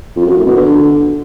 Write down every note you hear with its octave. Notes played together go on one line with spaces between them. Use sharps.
F2
F#2
A2
B2
D3